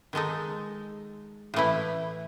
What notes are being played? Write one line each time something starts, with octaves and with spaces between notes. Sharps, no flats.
D#3 G#3 D#4 A4
A2 E3 A3 E4